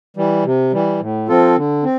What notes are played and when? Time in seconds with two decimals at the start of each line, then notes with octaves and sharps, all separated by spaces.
0.17 E3 G3
0.44 C3
0.73 E3 G3
1.00 A2
1.28 F3 C4 F4 A4
1.57 D3
1.84 C4